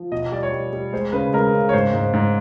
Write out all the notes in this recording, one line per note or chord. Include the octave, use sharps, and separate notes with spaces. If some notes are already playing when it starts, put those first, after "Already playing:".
Already playing: F3
B2 D#5
D#5
G3 D5
C#5
G3
G3
G#3 C5
C#3 B4
G#3 A#4
C#3
C#5
G#2 C5
G#2
G#2